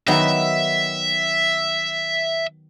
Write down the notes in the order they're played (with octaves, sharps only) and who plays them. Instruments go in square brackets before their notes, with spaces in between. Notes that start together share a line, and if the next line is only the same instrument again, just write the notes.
[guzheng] D#3 F#3 B3 [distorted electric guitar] E5